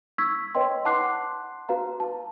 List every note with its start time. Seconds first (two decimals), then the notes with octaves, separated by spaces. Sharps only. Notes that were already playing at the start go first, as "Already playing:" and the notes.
0.18 C#6 E6 G#6 B6
0.55 B4 C#5 D#5 G5 C6
0.85 F#5 A5 C6 D6 F#6 C7
1.69 F#4 B4 F5 A#5
2.00 A5